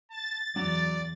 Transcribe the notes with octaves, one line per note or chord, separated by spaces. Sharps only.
A5 A6
E2 F#3 D5